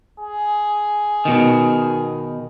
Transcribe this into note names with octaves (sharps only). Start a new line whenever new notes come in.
G#4
B2 D#3